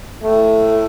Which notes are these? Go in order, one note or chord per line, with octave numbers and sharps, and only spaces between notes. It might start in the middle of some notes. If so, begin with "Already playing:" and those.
A2 A3